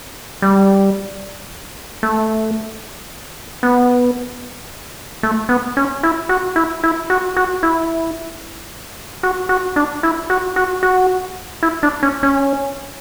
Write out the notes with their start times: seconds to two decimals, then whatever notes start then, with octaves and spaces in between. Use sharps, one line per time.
0.42 G3
2.03 A3
3.63 B3
5.23 A3
5.49 B3
5.77 C#4
6.03 E4
6.29 F#4
6.56 E4
6.83 E4
7.10 F#4
7.36 F#4
7.63 E4
9.23 F#4
9.49 F#4
9.76 D4
10.03 E4
10.30 F#4
10.56 F#4
10.83 F#4
11.63 E4
11.83 D4
12.03 C#4
12.23 C#4